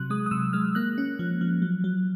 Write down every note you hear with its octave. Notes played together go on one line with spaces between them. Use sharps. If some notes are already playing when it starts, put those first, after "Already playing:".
Already playing: C3 F#3 F#6
G#3 D#6
D#6
C3 E6
G#3 F6
A#3 F#6
C#4
F3
F3
F#3
F#3